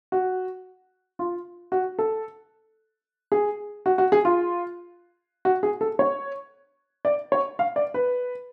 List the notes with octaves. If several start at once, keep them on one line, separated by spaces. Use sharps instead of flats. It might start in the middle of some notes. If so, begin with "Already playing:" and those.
F#4
F4
F#4
A4
G#4
F#4
F#4
G#4
F4
F#4
G#4
A4
C#5
D5
C#5
F5
D5
B4